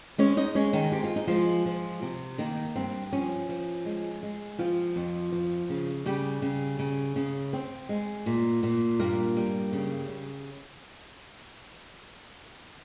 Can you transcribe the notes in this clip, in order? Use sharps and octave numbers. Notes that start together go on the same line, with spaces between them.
G#3 C#4 C#5
D#4 D#5
G#3 C#4 C#5
D#3 D#4
C4 G4
F4
D#4
F3 G#3 F4
F3
C3
D#3 A#3 D#4
G2 C4
F3 C#4
F3
G#3
G#3
F3 C4 F4
F2
F3
C#3
C#3 G3 G4
C#3
C#3
C#3
C4
G#3
A#2
A#2
G2 A#3 A#4
G3
C#3
C#3